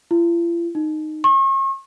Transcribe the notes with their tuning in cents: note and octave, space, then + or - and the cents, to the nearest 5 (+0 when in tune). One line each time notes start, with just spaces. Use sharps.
F4 -45
D#4 -10
C#6 -40